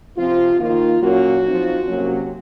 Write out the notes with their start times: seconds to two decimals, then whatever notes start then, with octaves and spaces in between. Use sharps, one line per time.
0.16 C3 F3 C4 F4
0.59 D#3 A#3 D#4 F4
1.02 A#2 F#3 A#3 C#4 F#4
1.44 F3 C4 D#4
1.88 C3 F#3 A#3 C#4